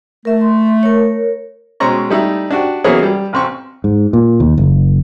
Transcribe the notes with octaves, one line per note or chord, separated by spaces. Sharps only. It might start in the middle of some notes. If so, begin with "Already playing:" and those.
A3 A#4 E5
C6
A#4 C#5
B2 G#3 C4 C#4 A#5 C#6
G3 A3 D#4 E4
D4 F#4 G4
E3 F#3 A#3 B3 C#4 G#4
G3
A1 C4 C#6
G#2
A#2
D#2
F#1